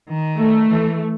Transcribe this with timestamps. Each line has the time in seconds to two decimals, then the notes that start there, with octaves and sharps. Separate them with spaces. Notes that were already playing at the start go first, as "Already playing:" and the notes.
0.09 D#3
0.38 A3
0.69 E3